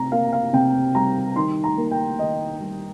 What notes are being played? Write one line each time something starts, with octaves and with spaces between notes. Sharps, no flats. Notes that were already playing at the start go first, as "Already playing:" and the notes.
Already playing: C3 A#5
A#3 F5
F5
C3 G5
G3 A#5
D#3 C6
A#5
A#3
G5
D#3 D#5
G3